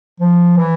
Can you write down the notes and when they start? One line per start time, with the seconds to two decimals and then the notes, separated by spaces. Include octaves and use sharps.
0.20 F3
0.57 E3